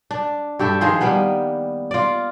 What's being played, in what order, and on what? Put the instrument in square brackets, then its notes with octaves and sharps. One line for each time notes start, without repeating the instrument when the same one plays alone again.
[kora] D4
G2 G4 A4 E5
D#3 F3 G#4 C5
G3 A#3 B3 B4
F4 D5